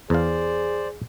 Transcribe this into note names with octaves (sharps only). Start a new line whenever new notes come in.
E2 G#4 C5 D5 F5